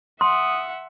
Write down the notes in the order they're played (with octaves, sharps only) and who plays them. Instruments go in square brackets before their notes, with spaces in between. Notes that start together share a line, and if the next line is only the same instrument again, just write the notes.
[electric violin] E5 F#5 [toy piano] C6 [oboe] D#6